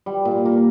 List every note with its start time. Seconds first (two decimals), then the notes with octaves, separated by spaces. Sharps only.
0.06 G3
0.25 A#2
0.45 A#3